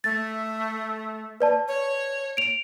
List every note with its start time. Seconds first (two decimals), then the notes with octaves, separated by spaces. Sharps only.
0.04 A3 A6
1.40 B4 D5 A5
1.68 C#5
2.37 D7 F7